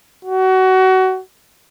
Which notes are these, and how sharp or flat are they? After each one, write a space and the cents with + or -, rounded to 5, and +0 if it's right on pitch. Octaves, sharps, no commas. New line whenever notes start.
F#4 +25